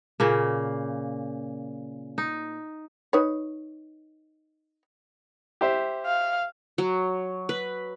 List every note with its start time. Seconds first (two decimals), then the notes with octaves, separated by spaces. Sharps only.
0.20 A#2 C#3 A#3
2.18 D#4
3.13 D#4 B4 C#5
5.61 G4 C5 E5
6.06 F5
6.78 F#3
7.49 B4